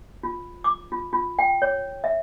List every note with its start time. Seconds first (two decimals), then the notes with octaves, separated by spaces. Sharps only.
0.23 F4
0.64 D6
0.92 F4
1.13 F4
1.39 G5
1.62 C#5
2.04 E5